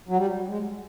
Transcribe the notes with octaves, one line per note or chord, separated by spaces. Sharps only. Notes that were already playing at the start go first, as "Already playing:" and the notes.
F#3
G3
G#3